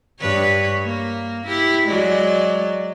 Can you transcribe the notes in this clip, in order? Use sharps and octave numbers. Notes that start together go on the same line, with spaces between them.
G2 B4 C#5
A#3
E4 G4
F#3 G#3 D5